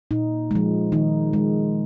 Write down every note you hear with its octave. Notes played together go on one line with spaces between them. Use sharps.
A#2 D#4
F3 G#3
D#3 D#4
G#3